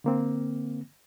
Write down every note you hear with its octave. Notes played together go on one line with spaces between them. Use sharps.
D3 A#3 C4